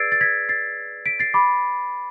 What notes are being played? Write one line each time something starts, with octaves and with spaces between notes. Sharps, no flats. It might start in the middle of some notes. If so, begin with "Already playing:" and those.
Already playing: G#4 B4 D5 E6 G#6 A6 C7 D7
A6
G#6 B6
A6 C7
B6 D7
A6 C7
B5 D6